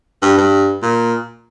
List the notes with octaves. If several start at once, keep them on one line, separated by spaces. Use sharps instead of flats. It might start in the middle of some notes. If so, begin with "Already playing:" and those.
G2
G2
A#2